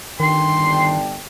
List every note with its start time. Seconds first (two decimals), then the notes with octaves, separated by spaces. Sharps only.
0.20 G1 D#3 D4 G5 C6